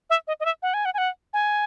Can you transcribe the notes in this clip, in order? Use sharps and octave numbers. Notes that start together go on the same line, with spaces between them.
E5
D#5
D#5
E5
F#5
G#5
F#5
G#5
F#5
G#5